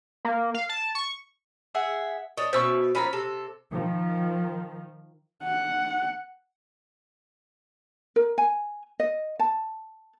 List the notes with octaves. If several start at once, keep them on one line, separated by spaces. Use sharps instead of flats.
A#3
F5
A5
C#6
G#4 E5 F#5
D4 C#5 D#5
B2 C#4 E4 C5 C#6 E6
F3 C#4 D#5 G#5 A#5 B5
C3 A4
D#3 F3
F#5
A#4
G#5
D#5
A5